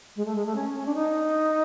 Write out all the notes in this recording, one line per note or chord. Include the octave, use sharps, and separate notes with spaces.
G#3
A3
G#3
A3
C#4
C#4
D4
D#4